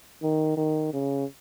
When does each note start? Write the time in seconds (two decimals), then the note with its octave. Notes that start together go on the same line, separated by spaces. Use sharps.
0.22 D#3
0.57 D#3
0.93 C#3